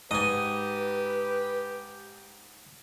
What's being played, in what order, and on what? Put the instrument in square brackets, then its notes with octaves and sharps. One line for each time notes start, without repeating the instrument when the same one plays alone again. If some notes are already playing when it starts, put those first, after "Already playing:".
[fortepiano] G#2 [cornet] G4 [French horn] B4 [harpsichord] D#5 G#5